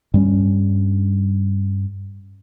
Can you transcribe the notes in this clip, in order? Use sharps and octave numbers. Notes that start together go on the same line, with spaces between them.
G2 G3 C#4